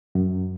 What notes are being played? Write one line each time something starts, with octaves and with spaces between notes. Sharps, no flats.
F#2